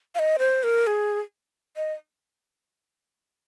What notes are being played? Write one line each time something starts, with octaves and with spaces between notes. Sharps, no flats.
F5
D#5
C5
A#4
G#4
D#5